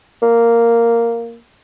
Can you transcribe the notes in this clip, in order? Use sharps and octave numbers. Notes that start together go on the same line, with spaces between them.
A#3